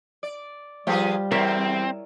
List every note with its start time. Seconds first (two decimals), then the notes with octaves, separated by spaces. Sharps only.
0.23 D5
0.87 F3 G3 F4 G4 G#4 B4 C5
1.31 E2 C4 A#4 C#5 E5